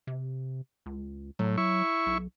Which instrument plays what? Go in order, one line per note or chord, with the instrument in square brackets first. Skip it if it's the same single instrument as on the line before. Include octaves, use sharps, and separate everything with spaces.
[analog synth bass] C3
C#2
[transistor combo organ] A2 [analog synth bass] F#3
[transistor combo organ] E4 C#6
[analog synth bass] B1